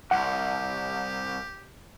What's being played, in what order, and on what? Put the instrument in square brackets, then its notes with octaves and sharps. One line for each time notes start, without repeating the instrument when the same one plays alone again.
[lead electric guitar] C2 [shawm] G4 [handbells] F#5